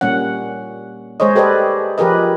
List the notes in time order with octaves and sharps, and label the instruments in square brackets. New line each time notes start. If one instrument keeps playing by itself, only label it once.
[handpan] A#2 G3 A#3 C#4 F#5
G#3 G#4 C5 C#5 D#5
G4 A4 B4 C5 D5 D#5
F3 G4 G#4 A#4 B4 D#5